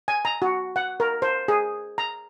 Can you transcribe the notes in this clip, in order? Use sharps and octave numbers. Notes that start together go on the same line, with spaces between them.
G#5
A#5
F#4
F#5
A#4
C5
G#4
A#5